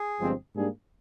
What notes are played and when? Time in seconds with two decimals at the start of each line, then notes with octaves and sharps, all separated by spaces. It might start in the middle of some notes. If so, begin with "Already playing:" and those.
Already playing: G#4
0.20 G1 G2 F3 G#3 C4
0.54 G#2 G3 A#3 D4 G#4